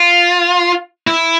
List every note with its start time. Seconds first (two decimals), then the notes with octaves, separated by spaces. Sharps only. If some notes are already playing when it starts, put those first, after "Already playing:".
Already playing: F4
1.07 E4